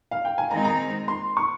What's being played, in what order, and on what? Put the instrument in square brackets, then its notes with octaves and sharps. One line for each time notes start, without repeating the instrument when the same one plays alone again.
[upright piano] F5
G5
G#5
[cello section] D#3 G#3 C4 D#4 [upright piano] A#5
[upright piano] A#5
C6
C#6